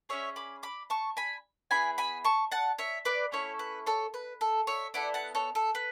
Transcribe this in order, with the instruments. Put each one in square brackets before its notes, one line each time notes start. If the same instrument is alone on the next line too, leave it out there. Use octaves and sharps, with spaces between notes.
[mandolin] C#4 G#4 C#5 E5
B5 D6
B5 D6
A5 C#6
G#5 B5
B3 E4 G#4 G#5 B5
G#5 B5
A5 C#6
F#5 A5
C#5 E5
B4 D5
A3 C#4 E4 A4 C#5
B4
A4 C#5
B4
A4
C#5 E5
B3 E4 A4 D5 F#5
F#5 A5
A4 C#5
A4
B4